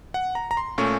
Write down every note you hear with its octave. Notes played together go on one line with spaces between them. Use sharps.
F#5
A#5
A#5
C6
A#2 A3 C#4 C#6